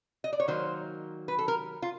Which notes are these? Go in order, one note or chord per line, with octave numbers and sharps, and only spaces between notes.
D#5
D5
C#5
D#3 F#3 A#3 C5
B4
A4
A#4
F4